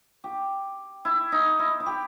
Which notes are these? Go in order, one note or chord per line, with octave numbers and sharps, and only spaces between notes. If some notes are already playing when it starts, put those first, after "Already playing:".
G4
E4
D#4
E4
E4
G4